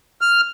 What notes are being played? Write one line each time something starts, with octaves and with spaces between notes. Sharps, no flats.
F6